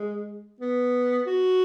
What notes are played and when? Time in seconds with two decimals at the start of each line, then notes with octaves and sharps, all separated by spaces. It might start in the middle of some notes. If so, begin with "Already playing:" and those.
Already playing: G#3
0.61 B3
1.27 F#4